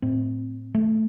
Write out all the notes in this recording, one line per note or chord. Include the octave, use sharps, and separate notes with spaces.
A2 C4
A3